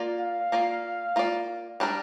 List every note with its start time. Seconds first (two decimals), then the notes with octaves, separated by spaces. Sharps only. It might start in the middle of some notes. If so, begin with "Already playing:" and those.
Already playing: A#3 F4 D5
0.20 F5
0.52 A#3 F4 D5
1.16 A#3 F4 D5
1.80 G3 D4 A#4